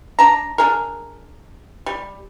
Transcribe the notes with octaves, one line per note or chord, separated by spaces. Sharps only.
D4 A5 A#5
D4 G#4 A#4
G3